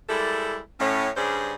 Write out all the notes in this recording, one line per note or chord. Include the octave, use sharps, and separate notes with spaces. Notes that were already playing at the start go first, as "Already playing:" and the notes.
G3 G#3 A#3 E4 A4
A2 C#4
G2 C#3 G3 D4 G#4 C5